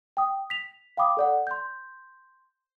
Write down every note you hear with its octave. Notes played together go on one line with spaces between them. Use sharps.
G5 D#6
B6 F7
F5 G5 B5 D6 D#6
A4 D5 F#5
C6 G6